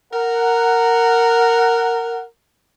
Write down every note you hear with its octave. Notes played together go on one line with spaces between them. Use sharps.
A#4 F#5